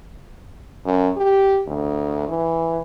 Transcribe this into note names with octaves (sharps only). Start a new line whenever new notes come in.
F#2
G4
D2
E3